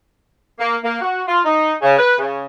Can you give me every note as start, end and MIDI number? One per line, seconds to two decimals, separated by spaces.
0.59 0.77 58
0.84 1.01 58
1.01 1.23 66
1.28 1.39 65
1.45 1.73 63
1.82 1.97 49
1.99 2.17 71
2.18 2.45 49